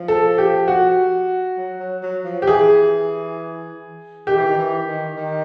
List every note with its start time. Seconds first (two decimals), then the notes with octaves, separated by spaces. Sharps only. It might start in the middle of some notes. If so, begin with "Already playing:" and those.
Already playing: F3
0.08 A4
0.38 G4
0.68 F#4
1.57 F#3
1.80 F#3
2.03 F#3
2.25 F3
2.42 G4
2.47 E3 G#4
4.27 D#3 G4
4.36 E3
4.46 D#3
4.58 E3
4.88 D#3
5.17 D#3